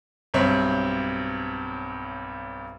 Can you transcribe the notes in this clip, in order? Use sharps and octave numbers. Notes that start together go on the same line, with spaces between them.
B1 G2 C4 C#5 E5